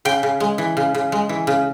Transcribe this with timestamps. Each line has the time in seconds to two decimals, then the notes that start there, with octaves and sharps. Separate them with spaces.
0.05 C#3 G5
0.23 C#3
0.40 G#3
0.58 E3
0.77 C#3
0.94 C#3
1.12 G#3
1.29 E3
1.47 C#3